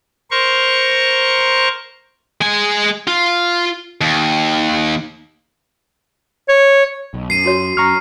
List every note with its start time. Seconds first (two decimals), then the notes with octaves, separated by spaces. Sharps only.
0.31 A#4 C5 C#6
2.41 G#3 G#5
3.07 F4
4.01 D#2
6.49 C#5
7.14 B1
7.30 F#2 C7 D#7
7.44 F4 F#4 C#5
7.77 F#2 A#5 C#6 F6